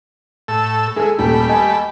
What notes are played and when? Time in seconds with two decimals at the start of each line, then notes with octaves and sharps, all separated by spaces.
0.48 A2 A4 E6
0.96 G#3 E4 G#4 A4
1.19 D#1 G3 A3 B5
1.49 D#5 G#5